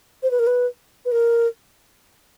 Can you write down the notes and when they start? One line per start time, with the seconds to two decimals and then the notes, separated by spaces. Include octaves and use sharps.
0.23 C5
0.31 B4
0.39 A#4
0.47 B4
1.05 B4
1.12 A#4